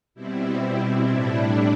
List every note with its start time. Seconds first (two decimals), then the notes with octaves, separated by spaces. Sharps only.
0.14 B2 G3 C4 E4
0.61 E4
1.09 A2 G3 D4 E4